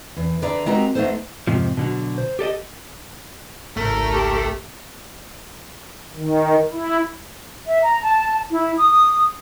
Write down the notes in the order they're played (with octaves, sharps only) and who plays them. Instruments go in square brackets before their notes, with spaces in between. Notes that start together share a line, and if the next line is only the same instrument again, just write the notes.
[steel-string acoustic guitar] E2
D3 G#4 B4 D5 E5 A#5
G#3 C4 F#4 G4 A#4 A#5
A3 B3 D#4 A4 C5
[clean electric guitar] F2 G#2 C3 F3
B2 D3 F#3
C5
G4 A4 D5 D#5
[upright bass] G#1 C#2 [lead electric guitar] A3 [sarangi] A#4
[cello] G4 A4
[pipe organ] D#3
E4
[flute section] E5
A#5
A5
E4
D#6